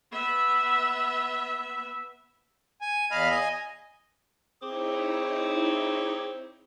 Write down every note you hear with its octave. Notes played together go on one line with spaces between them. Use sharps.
B3 E5
G#5
E2 D#5 F5 B5 F6
D#5 G#5
C4 D#4 E4 G#4 C#5 D6